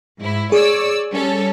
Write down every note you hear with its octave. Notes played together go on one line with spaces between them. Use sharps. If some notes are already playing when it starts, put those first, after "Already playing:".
G#2 E4
G#4 C#5 D5 E6
G3 C#4 A4